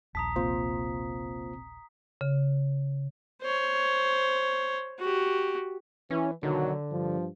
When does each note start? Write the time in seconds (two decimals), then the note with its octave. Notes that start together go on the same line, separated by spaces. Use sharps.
0.15 D#1 A#1 A5 A#5 D#6 B6
0.36 C3 A#3 F4 C5
2.21 C#3
3.42 C5 C#5
4.99 F#4 G4
6.11 E3 C#4
6.43 B1 D3 D#3 F#3
6.90 G2 F3